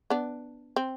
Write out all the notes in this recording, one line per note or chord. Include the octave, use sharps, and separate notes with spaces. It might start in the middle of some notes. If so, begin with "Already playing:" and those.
B3 D4
C4